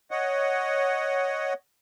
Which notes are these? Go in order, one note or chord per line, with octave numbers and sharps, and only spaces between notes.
C#5 D#5 F#5